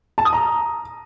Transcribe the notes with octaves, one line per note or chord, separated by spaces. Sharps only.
A5
D#6
A#5